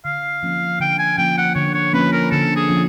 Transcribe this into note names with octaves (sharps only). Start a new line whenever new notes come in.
D3 F5
F3 A#3 C#4
D3 G5
G#5
F3 A#3 C#4 G5
F#5
D3 C#5
C#5
F3 A#3 C#4 B4
A#4
D3 A4
G#4
F3 A#3 C#4